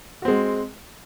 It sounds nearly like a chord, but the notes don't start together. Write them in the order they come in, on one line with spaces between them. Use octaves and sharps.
F#4 C4 G#3